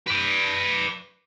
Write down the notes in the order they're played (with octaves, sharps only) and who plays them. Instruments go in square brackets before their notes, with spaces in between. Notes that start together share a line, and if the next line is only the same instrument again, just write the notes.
[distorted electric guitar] B4 D5